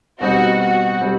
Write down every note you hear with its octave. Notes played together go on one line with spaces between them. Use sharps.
B2 G3 C4 D#4 F#4
F#4
B2 G3 C4 D#4